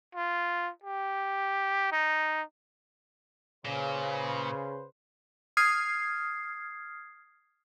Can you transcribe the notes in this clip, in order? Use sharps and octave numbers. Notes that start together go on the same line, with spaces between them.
F4
G4
D#4
A#2 C#3 B4 C5
D#6 F6 G#6 C7